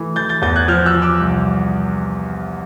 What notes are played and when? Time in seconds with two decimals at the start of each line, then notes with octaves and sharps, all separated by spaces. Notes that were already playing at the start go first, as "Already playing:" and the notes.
Already playing: E3 A3
0.16 E3 G6 A6
0.29 G6 A6
0.42 E2 G6 A6
0.56 F#6 G#6
0.68 F3 F6 G6
0.86 E6 F#6
0.94 F3
1.02 D6 E6
1.20 C2